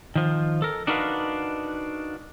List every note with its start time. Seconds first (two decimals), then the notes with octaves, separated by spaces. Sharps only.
0.15 D#3 F3
0.62 A4 A#4
0.87 D4 D#4 F#4 A#4 B4 F5